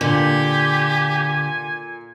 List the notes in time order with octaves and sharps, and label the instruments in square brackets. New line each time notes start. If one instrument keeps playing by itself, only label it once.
[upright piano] A#2 [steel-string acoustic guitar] D3 [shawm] G4 [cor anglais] G#5